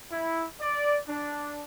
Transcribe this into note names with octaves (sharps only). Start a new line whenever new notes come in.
E4
D5
D4